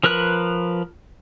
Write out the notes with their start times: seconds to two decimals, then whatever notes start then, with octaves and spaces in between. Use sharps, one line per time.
0.04 F3 A#4 B4 F#6